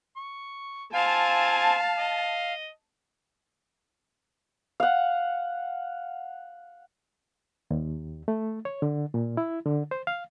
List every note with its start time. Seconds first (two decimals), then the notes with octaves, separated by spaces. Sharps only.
0.16 C#6
0.93 C4 F4 F5 G#5 A5
1.98 D#5
4.80 F5 F#5
7.71 D#2
8.28 A3
8.65 C#5
8.82 D3
9.14 A#2
9.37 E4
9.66 D3
9.91 C5
10.07 F5